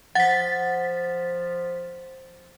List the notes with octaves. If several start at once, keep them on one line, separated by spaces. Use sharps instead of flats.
F3 F#5 A6 B6